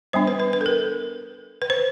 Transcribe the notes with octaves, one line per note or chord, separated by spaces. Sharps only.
G3 B3 D4 C5
B4
B4
B4
A4
A#4
B4
C5